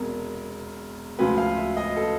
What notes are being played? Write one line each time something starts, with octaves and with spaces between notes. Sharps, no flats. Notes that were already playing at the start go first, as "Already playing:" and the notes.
Already playing: E1 E2 C3 A#4
D2 C#3 F3 G#3 B4
F5
E5
D#5
A4